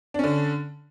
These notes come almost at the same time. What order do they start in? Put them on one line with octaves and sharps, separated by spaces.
D4 C#4 D3